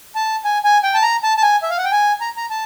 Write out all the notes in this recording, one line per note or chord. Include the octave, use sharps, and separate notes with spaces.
A5
G#5
G#5
G5
A5
A#5
A5
A5
G#5
E5
F5
F#5
G5
G#5
A#5
A#5
A5